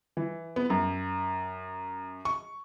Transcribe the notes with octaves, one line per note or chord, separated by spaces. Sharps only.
E3
B3
F#2
C#6